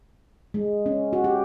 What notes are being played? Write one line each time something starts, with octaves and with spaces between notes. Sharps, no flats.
G#3
C#4
F#4
G4